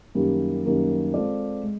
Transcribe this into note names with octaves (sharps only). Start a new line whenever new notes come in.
F#2 D#3 G3 A#3
F#2 D#3 G3 A#3
G#3 C4 F4 A4 D5
G#3